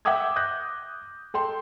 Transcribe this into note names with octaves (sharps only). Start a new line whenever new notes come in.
E5 F#5 G5 D6 D#6 G#6
D#6 F#6 G6 A#6
A4 G5 C6